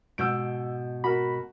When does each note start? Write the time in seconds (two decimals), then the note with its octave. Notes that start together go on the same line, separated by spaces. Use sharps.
0.18 G#2 B2 E6 G6 D7
1.04 F#4 A#4 B5